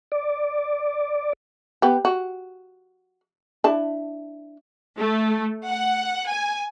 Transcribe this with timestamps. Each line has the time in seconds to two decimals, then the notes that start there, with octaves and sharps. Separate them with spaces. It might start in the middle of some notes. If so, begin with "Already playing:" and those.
0.12 D5
1.82 B3 G4
2.05 F#4
3.64 D4 E4 A5
4.97 A3
5.67 F#5
6.29 G#5